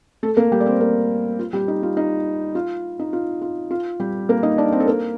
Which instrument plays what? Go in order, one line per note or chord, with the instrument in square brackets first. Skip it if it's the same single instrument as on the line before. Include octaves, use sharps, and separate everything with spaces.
[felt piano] A3 A4
A#3 A#4
G3 G4
D5
C4 C5
A#3 A#4
F4
G3 G4
D#4
F4
D#4
F4
D#4
F4
F4
F4
G3 G4
A#3 A#4
D#4 D#5
D4 D5
C4 C5
A4
A#3 A#4